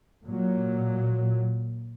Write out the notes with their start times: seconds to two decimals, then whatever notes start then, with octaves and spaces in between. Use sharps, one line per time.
0.24 A#2 F#3